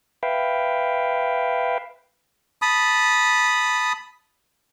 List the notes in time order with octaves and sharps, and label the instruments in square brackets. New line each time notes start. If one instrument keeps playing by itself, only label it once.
[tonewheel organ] B4 E5 F5 G5
[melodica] A5 B5 D#6